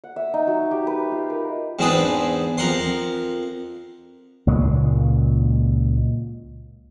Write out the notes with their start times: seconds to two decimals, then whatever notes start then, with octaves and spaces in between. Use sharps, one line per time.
0.04 F#5
0.16 E5
0.34 D#4
0.47 F#3
0.71 G4
0.87 B4
1.11 F4
1.30 A#4
1.79 E2 G#2 C4 D4 G#4 B4
2.58 F2 A#4 F#5 C6
4.47 C#2 A#2 F#3 G#3